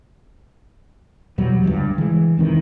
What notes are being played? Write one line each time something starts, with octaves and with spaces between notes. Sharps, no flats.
E2 B2 F#3 G3
G1 C#2 G2
E3 G#3
F1 C3 D#3 E3